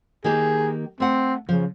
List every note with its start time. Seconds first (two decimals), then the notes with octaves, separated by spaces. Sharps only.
0.24 D#3 A#3 G4 G#4
1.00 A3 C4 F#5
1.49 C#3 F3